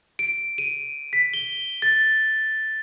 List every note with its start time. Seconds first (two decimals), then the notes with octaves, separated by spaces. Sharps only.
0.19 D7
0.58 D#7
1.13 B6
1.34 G7
1.82 A6